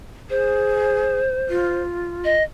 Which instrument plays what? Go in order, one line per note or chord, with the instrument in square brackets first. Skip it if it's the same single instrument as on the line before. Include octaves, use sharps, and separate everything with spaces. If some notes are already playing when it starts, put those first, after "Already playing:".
[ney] G#4 [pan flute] C5
[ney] F4
[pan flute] D#5